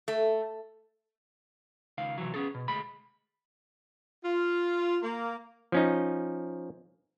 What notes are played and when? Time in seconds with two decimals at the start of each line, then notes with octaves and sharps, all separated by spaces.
0.08 A3
1.98 C#2 D#3 F5
2.18 C3 E3 F#3
2.34 B3 C#4 G#4 A4
2.55 B2
2.68 D2 G#3 B5
4.24 F4
5.03 A#3
5.72 F3 C#4 D#4